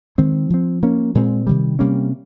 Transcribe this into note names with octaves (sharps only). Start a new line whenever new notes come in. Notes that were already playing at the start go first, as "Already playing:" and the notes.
D#3 G#3 C4
F3 C4
F3 A#3 C#4
A#2 G#3 C4
C3 D#3 G3
C3 G3 A#3 C#4